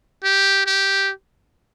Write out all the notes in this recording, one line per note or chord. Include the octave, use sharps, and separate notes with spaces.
G4
G4